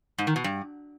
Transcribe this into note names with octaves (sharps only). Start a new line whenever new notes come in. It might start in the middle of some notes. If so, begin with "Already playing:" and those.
G#2
D#3
B2
G2